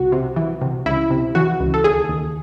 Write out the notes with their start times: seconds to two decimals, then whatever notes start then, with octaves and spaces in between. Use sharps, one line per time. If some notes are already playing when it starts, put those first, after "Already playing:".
Already playing: C2 F#4
0.12 C3
0.36 E3
0.61 C3
0.86 C#2 E4
1.10 C3
1.35 E3 F#4
1.60 C#2
1.74 A4
1.84 D#2 G#4
2.09 D#2